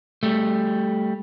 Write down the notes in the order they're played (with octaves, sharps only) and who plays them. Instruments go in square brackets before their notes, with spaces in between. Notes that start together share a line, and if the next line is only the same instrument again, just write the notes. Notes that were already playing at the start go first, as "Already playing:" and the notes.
[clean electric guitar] G3 A3